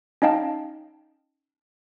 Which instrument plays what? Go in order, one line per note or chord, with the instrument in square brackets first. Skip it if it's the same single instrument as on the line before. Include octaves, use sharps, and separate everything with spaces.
[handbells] C#4 D#4 D#5 F5 G5 A5